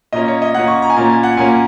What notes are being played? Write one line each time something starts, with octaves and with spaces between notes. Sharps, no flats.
A#2 A#3 C#4 D#5
C#5
D#5
A#2 A#3 C#4 F#5
C#6
A#5
G#5
A#2 A#3 C#4 A#5
G#5
F#5
A#2 A#3 C#4 G#5